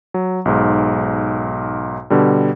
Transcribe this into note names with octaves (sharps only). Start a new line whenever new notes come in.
F#3
B1 G#2
B2 D3 G3